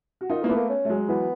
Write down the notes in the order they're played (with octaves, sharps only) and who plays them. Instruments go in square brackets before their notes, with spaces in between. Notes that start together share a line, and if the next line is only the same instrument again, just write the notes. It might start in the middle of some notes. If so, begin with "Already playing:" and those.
[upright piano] F#4
[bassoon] D#3 [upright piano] D#4 F4
[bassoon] E3 [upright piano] A#3
[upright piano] A3 B3
[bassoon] A#3
C#4
[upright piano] A3
F#3 G#3
[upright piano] E3 F#3 [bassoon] B3